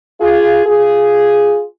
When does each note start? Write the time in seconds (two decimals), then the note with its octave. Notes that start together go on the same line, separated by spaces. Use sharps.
0.20 F4 G#4
0.66 F4 G#4